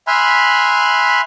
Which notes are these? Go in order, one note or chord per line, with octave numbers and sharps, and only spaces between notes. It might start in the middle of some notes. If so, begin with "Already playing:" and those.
E5 G#5 B5 C6 F6 F#6